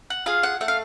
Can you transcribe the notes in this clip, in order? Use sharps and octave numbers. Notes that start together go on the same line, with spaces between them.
F#5
F4 G#4 F5
F#5
A3 F#5
F5